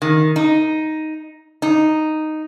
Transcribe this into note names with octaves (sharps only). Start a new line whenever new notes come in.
D#3
D#4
D#4